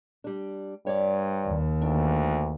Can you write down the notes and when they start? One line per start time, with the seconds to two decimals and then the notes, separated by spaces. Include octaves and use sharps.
0.24 G3 D4
0.87 G2 C#5 D5
1.47 D#2
1.82 D2 D4